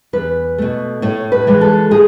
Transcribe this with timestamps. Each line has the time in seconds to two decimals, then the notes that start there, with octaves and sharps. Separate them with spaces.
0.13 E2 B4
0.58 B2 A3
1.02 A2 C#5
1.32 B4
1.47 E3 G#3
1.61 A4
1.91 A2 G#4